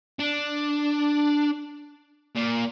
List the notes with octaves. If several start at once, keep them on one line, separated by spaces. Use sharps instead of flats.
D4
A#2